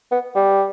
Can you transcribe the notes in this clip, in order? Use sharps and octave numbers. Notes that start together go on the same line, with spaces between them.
B3
G3